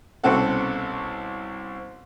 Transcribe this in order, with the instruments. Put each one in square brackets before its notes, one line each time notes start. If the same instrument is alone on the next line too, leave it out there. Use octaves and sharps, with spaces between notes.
[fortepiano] C2 B2 C4 C#4 A4 F#5